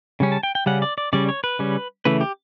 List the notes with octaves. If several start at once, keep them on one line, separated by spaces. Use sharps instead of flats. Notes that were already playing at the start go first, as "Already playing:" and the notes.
C#3 G3 C#4
A5
G5
G5
C#3 G3 C#4 F#5
D5
D5
C#3 G3 C#4 D5
C#5
B4
C#3 G3 C#4
C#3 E3 A3 B4
G4